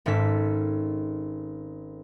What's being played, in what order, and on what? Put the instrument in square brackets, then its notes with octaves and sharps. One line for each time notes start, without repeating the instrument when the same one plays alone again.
[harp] G#1 G#2 C#4 A4 B6